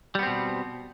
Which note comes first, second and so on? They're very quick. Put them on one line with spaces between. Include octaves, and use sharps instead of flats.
G3 B3 C4 B2